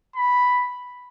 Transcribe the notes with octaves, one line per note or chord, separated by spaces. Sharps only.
B5